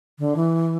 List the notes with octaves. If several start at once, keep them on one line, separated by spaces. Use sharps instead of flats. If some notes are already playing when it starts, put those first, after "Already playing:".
D3
E3